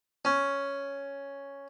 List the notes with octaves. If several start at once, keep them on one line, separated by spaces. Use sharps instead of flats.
C#4